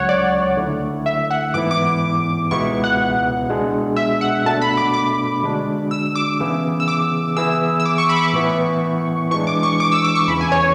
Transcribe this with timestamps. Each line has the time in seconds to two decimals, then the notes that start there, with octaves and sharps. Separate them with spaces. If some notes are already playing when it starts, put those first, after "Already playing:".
Already playing: C#2 C#3 F#3 C#5 F#5
0.09 D5
0.57 D3 A3 E4
1.06 E5
1.31 F#5
1.54 G#2 E3 B3 E4 D6
1.71 D6
2.51 C#2 B2 G#3 B3 E4 C#6
2.84 F#5
3.49 B2 G#3 D4 G#4
3.96 E5
4.21 F#5
4.45 B2 A3 D4 A4 A5
4.62 B5
4.77 D6
4.94 D6
5.43 D3 G#3 D4 F#4
5.91 E6
6.15 D6
6.40 C#3 E3 B3 E4 G#4
6.80 E6
6.88 D6
7.37 E3 B3 E4 G#4 E6
7.80 E6
7.85 D6
7.98 C#6
8.09 B5
8.16 D6
8.22 C#6
8.33 A2 E3 B3 E4
9.31 E3 G#3 D4 C#6
9.47 D6
9.63 C#6
9.80 D6
9.92 E6
10.04 D6
10.15 C#6
10.28 E2 C#3 E3 B5
10.41 G#5
10.52 C#5